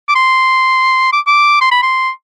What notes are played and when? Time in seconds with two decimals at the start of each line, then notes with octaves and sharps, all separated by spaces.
0.08 D6
0.15 C6
1.13 D6
1.27 D6
1.61 C6
1.72 B5
1.82 C6